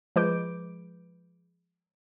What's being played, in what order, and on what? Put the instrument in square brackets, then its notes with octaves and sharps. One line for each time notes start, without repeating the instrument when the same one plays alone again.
[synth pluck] F3 G#3 B4 D6 G6 D7